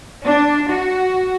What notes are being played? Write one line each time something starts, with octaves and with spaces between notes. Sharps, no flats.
D4
F#4